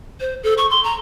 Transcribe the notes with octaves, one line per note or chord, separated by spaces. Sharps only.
C5
A4
C#6
C6
A#5